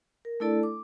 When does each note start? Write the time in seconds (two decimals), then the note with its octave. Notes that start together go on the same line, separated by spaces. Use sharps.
0.25 A#4
0.40 A3 D4 E4 A4 D5 A5
0.63 D6